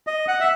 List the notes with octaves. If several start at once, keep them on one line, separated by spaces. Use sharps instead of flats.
D#5
F#5
E5